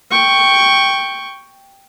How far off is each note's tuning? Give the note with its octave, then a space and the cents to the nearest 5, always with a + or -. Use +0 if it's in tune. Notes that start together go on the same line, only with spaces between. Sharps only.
G5 +0 C#6 +0